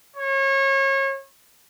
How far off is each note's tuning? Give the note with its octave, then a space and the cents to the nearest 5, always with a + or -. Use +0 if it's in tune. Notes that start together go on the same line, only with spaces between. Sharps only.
C#5 -30